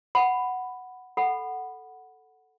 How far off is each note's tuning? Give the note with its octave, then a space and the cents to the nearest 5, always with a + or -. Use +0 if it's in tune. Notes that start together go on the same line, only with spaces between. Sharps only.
F#5 +0 B5 +5
A4 +0 F#5 +0 B5 +0